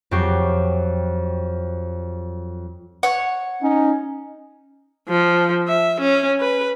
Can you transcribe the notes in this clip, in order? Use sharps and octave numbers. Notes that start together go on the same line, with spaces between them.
F2 F#3 G4 C#6 C7
C#5 F#5
C#4 D#4
F3
E5
C#4
B4